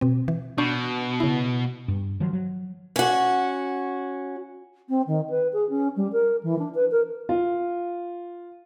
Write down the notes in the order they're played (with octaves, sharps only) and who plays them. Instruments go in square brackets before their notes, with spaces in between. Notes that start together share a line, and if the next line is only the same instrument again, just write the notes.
[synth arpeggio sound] B2 C4
E3
[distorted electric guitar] B2 [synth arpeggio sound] D4 C#6 G6
[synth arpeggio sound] C#3 E4
[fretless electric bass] G2
D#3 F3 F#3
F#3
[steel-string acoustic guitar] C#4 F#4
[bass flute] C4
D#3
B4
G#4
C#4
G3
A#4
E3
D4
B4
A#4
[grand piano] F4